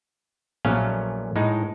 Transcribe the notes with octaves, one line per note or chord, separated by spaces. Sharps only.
A#1 A#2 F#3 A3 C#4 F5
A2 G#3 D#4